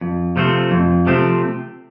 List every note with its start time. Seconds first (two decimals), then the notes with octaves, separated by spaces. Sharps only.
0.01 F2
0.36 C3 F3 A3 C4
0.71 F2
1.07 C3 F3 A3 C4